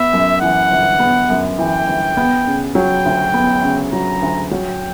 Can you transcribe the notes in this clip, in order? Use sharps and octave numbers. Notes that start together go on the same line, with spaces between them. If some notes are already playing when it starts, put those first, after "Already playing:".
Already playing: B3 E5
F#2
E3 F#5
G1
B3
F#2
E3 G5
G1
B3
C#3
F#3 G5
D2
B3
C#3
F#3 A#5
D2
F#3 G5